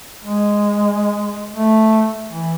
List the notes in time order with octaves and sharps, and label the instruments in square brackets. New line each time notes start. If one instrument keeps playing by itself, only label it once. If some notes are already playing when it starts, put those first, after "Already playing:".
[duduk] G#3
A3
E3